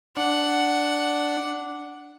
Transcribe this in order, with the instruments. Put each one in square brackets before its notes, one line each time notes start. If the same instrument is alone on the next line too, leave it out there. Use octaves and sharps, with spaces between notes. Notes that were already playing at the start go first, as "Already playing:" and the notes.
[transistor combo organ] D4 [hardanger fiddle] F#5